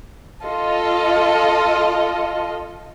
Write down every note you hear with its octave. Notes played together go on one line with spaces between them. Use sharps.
F4 A4 D#5